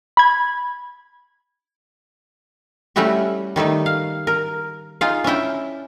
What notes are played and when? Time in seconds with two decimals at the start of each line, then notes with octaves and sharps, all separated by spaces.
0.17 B5 G#6
2.96 G3 A3 C#4 E4 F#4 G4
3.56 D#3 G3 A3 D#4
3.86 F5
4.27 A#4
5.01 D#4 F4 G#4 F5
5.24 C#4 D4 E4 G5